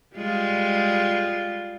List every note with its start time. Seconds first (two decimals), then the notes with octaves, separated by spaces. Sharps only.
0.16 G3 G#3 F4